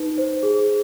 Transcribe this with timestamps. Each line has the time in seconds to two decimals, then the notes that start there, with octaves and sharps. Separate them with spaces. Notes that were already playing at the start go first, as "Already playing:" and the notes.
Already playing: D#4 B4
0.18 C5
0.43 G#4